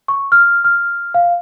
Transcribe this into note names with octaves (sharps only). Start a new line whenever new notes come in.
C#6
F6
F6
F5